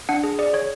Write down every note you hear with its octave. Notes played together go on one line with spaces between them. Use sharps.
D4 F#5
G#4
G#4 D5
G#4 C#5